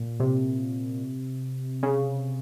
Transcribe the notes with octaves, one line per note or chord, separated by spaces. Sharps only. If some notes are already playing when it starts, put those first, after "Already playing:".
Already playing: A#2
C3
C#3